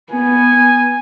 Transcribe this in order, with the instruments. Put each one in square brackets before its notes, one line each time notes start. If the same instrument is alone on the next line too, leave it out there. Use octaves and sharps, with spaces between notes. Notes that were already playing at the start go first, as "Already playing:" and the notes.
[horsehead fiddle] B3 [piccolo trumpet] G#5